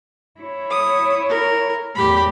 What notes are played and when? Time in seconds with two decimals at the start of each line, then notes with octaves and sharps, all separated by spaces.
0.40 E4 C#5
0.71 D#6
1.29 A#4
1.95 E2 A2 G4 B5